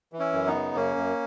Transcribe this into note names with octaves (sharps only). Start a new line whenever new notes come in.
E3
C#4 E4
F#2
B3 D#4
C#3
F#2 A#3 C#4
F#2